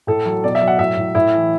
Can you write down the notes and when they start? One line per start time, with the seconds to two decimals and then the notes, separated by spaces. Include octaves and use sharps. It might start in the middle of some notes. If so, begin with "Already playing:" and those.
0.07 A2 A4
0.26 F#3
0.44 B2 D5
0.55 E5
0.62 F#3
0.68 F#5
0.79 A2 E5
0.97 A2
1.15 A2 E4
1.34 E3